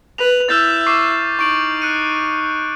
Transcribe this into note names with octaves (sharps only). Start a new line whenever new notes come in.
B4 F7
E4 E5 F6 G6 A6
C#6 D6 C7
D#4 C#6 D7 F#7
F#6 C#7 D#7